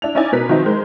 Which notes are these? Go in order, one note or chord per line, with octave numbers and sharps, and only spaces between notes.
D4 E4 F7
C#4 D#4 E4 D5 G#5
B2 A#4 B4 A#5 B6
D#3 F3 F#3 C4 D#4
G#3 A#4 C5